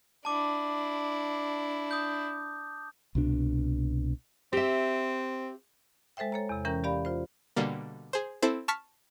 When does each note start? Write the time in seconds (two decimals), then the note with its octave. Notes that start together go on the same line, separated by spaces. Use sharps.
0.25 D4 E4 A5 D6
1.91 D#6 G6
3.15 C2 B2 D4
4.53 C4 G4 E5
6.17 G#3 A4 C5 E5 G5
6.32 A4 C#5 A#5
6.49 E2 C3
6.65 E3 C#4 A#4 G5 A#5 G6
6.84 G4 D5 F5 B5
7.05 F4 C5
7.56 B2 D3 G3 A#3
8.13 G#4 C5
8.42 C4 E4 A4 C5
8.68 A5 C#6 F6 B6 C#7